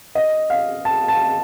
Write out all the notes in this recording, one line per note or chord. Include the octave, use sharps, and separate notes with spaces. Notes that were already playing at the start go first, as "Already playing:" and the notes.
D#5
F5
A5
A5